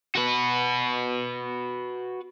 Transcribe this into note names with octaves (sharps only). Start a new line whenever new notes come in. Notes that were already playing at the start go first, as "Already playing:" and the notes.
F#4 B4